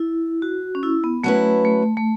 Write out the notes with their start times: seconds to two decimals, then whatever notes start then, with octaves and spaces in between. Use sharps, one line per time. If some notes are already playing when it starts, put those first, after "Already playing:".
Already playing: E4
0.42 F#4
0.75 C#4
0.83 E4
1.04 B3
1.24 F#3 A3 C#4 E4 B4
1.65 A3
1.97 A3